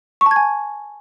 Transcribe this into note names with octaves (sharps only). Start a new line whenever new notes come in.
C#6
A5
G#6
G#5